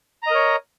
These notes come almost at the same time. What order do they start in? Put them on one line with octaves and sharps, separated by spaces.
A#5 D#5 A#4 C#5